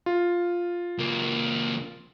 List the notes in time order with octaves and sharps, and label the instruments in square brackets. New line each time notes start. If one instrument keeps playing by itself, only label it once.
[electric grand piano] F4
[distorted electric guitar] C#2 A#3